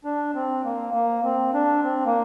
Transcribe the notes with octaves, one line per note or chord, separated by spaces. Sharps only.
D4
C4
A#3
A#3
C4
D4
C4
A#3